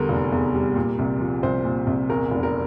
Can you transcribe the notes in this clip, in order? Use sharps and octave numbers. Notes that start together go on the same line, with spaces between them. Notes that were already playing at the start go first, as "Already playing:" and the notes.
Already playing: E2 D3 G3 A#4
F1
E2
G3
A#2
C2
F3
C2 C5
A#2
C2
E2 A#4
F1
A#4